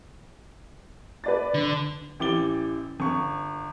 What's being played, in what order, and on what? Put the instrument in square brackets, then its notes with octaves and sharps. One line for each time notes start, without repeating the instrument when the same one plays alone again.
[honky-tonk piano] B4 D5 A6
[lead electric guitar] D3
[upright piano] A1 E3 G4 D6 A6 G7
G1 C#6